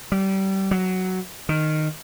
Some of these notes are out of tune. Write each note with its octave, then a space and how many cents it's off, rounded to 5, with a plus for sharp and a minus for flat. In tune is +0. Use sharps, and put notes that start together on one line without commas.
G3 -25
F#3 +5
D#3 -10